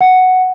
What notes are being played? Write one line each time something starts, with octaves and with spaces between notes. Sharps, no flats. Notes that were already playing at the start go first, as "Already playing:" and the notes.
F#5